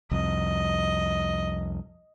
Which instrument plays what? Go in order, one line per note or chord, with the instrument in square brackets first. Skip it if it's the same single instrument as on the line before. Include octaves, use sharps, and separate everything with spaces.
[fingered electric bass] C2 F2 [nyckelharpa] D#5